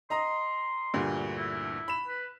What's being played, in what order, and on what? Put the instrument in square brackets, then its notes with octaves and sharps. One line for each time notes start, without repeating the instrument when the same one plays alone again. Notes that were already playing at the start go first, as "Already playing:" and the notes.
[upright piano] D#5 A#5 D#6 [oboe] C6
[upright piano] D2 G2 A#2
[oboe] E4
[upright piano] B5 E7
[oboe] B4